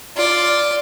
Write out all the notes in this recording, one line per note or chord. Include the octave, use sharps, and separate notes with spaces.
F4 D5